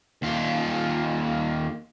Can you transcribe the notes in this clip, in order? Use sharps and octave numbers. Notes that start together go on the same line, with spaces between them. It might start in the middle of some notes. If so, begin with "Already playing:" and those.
D#2 F4